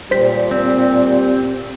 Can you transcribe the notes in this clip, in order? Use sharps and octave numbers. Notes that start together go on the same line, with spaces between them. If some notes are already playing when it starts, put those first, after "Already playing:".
A#2 G3 C5 B6
C4